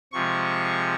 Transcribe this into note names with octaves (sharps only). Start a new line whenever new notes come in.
C3 F3 G#3 C#6